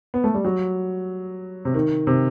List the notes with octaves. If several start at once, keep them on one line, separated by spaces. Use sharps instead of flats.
B3
A3
G3
F#3
C3
D#3
C3